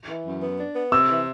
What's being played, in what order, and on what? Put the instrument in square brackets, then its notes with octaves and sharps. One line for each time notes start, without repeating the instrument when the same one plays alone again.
[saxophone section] E3
F#2
B3
D4
B3
[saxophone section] C3 [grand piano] E6
[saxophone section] E3